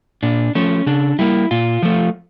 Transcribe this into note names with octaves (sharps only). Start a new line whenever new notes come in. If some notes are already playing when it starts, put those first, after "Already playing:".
A#2 D4
F3 A3 C#4
C#3 D4
G3 A#3 E4
A#2 F4
F3 A3